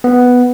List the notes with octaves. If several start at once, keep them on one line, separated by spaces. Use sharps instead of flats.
B3